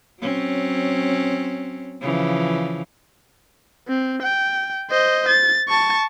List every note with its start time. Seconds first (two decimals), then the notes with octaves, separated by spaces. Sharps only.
0.20 F#3 C4 C#4
2.01 C#3 E3 F3
3.88 C4
4.23 G5
4.90 C5 D#5
5.28 A6
5.69 A5 C#6